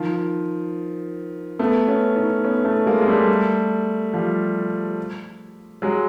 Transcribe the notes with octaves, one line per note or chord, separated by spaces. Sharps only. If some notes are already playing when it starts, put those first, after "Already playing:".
Already playing: D#3 F3
A3 B3
B3 C#4
C#4 D#4
B3 C#4
A3 B3
G#3 A#3
G#3
G3 A3
F3 G3
F#3 G#3